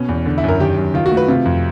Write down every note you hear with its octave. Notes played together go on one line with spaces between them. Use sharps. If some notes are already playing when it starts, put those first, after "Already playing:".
Already playing: B2 C#4
E2
D3
E4
F#2 A#4
D#3 G4
F#2
D#3 F4
F#4
A3
B4
C3 F4
F2